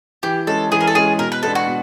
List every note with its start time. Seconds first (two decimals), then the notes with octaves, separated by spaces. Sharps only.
0.23 E3 G4
0.47 G#3 C#4 A4
0.72 E3 G#4
0.81 A#4
0.87 A4
0.95 G#3 C#4 G#4
1.19 B2 A#4
1.32 B4
1.43 G#3 B3 D4 A4
1.55 F#4
1.67 B2